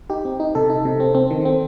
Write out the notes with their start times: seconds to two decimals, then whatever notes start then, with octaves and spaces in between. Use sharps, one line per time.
0.10 D#4 G4
0.25 C4
0.40 D#4
0.55 C3 A4
0.70 D#4
0.85 C3
1.00 C4
1.15 C4
1.31 D#3
1.45 C4